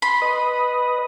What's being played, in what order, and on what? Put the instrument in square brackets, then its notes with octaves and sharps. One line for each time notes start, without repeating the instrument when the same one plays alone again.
[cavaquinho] B5 [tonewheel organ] C6
[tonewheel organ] B4 D#5